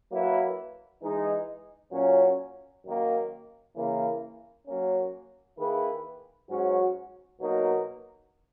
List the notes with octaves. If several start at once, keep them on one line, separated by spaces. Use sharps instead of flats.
F#3 A#3 E4 B4
E3 G#3 D#4
A#2 F#3 C#4
F#2 D#3 A#3
C#3 E3 A#3
F#3 A#3 C#4
D#3 A#3 E4 G#4 B4
G#2 F#3 C#4 F#4
B2 F#3 A#3 D#4 A#4